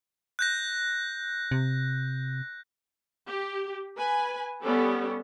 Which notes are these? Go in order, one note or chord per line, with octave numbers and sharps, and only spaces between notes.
F#6 G6 A#6
C3
G4
B4 G#5
G3 B3 C#4 G4 A4